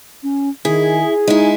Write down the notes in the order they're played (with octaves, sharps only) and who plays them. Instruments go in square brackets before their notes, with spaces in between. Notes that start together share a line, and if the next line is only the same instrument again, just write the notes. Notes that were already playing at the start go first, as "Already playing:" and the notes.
[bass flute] C#4
[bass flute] D#3 [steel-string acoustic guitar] E4 [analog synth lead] G#4
[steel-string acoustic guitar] G#3 E4 [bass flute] D#4